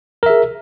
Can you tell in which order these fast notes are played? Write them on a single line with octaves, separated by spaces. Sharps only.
A#4 E5 G#4